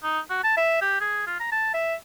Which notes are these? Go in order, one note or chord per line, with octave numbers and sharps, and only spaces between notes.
D#4
F#4
A5
E5
G4
G#4
F4
A#5
A5
E5